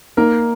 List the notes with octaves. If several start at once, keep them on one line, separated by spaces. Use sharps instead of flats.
A#3 D#4 A#4